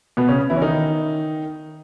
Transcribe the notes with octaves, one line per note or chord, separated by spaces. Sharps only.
B2 B3
C#3 C#4
E3 E4
C#4
D#3 D#4